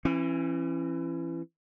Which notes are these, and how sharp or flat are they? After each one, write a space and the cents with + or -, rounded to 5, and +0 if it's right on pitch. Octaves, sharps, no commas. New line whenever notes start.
E3 +25 C#4 -35